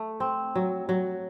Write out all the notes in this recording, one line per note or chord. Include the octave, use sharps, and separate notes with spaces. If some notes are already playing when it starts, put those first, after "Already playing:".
Already playing: A3
C4
F#3
F#3